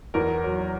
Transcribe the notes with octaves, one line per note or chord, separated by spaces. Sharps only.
E2 A#4
F#3